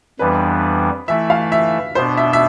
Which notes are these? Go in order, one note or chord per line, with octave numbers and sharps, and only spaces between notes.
F2 E3 G3 B3 D4 B4
E3 A3 E4 E5
F5
E5
B2 B3 D4 C5
E5
E5